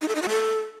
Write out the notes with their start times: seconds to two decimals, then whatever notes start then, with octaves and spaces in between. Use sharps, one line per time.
0.01 D#4
0.08 A4
0.15 D#4
0.22 F#4
0.29 A4